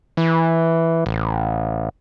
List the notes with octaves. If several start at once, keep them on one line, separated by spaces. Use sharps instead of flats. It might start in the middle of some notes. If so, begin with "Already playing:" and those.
E3
A1